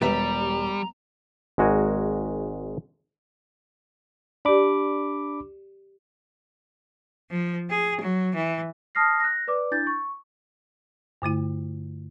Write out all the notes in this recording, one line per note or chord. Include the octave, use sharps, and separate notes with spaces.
E1 G3 G4 B4 E5 A#5
G#1 G#3 F#4 A#4 G#5
D4 G4 D5 B5 D6
F3
G#4
F#3
E3
A5 D#6 F6 A#6 C7
F#6 A#6
B4 D5 D6
D4 E4 G6 A6
C#6
G2 D3 A3 E4